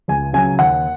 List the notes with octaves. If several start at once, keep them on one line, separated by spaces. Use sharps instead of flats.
C#2 G#5
C#3 F#3 G#5
D#2 F#5